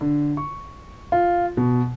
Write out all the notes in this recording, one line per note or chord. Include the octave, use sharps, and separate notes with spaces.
D3
C#6
F4
B2